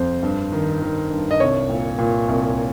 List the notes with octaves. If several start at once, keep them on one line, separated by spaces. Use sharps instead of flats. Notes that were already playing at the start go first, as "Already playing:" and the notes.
Already playing: F2 C5
G2
D#3
D#3
G2
D#5
C2 C#5
A#2
A#2
C2